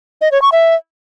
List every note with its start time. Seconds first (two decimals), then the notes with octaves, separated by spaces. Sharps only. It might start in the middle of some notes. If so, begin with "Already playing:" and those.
0.21 D#5
0.32 C#5
0.42 C#6
0.52 E5